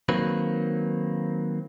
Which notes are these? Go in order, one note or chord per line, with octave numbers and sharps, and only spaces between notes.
D#3 F#3 A#3 C4 B4